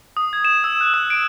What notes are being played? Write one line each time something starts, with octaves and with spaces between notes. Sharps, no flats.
D#6
G#6
E7
E6
F#6
E6
D7